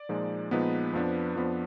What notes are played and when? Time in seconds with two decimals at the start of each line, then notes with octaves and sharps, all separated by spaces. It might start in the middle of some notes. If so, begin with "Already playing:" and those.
Already playing: D5
0.09 A#2 F3 G#3 D#4
0.51 A#2 F3 G#3 B3 D#4 B4
0.93 F2 F3 B3 D4
1.36 F2 F3 B3 D4